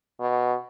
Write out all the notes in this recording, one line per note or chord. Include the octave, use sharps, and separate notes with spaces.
B2